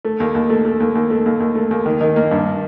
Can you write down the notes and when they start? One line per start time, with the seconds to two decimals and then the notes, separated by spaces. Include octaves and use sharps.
0.05 A3
0.20 D#2
0.35 D#2
0.50 A3
0.65 A3
0.80 D#2
0.95 D#2
1.10 A3
1.26 D#2
1.40 D#2
1.55 A3
1.71 D#2
1.86 D#3
2.01 D#3
2.16 A#3
2.31 G2